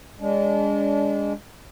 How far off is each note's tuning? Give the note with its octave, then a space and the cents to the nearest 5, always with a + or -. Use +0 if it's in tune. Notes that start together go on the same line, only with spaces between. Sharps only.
G#3 -25 D4 -35